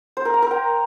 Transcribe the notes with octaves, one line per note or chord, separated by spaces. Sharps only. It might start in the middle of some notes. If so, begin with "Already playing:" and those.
C5
A#4
A#5
A#4
G5